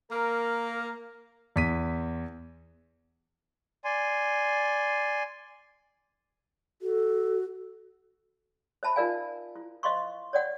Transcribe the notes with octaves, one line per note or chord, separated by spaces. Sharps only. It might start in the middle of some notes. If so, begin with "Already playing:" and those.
A#3 A#4
E2 B6 D#7
D5 G#5 C6
F#4 A4
C5 E5 A5 B5
D#4 F4 A#4 D5 F5 G#5
E4
C5 D#5 F5 C6 C#6
C#5 D5 F#5